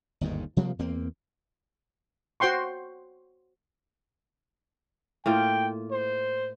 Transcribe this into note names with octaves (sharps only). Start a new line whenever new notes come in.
G1 D#2 G#2 D#3
C3 F3 G3 A#3
E2 A#3 C4
F#4 C5 G5 C6 C#6
A2 A#3 F4 G5
C5